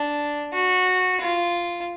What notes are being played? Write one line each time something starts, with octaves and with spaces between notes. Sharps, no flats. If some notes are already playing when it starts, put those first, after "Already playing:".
Already playing: D4
F#4
F4